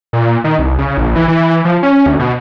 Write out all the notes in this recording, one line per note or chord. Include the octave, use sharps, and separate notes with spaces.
A#2
D#3
C2
C#3
A#1
E3
E3
F3
C#4
D2
B2